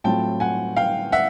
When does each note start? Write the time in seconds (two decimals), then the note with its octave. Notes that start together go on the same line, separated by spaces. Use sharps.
0.04 A2 F#3 A3 C4 F4 G5 A5
0.40 F#5 G#5
0.77 F5 G5
1.12 E5 F#5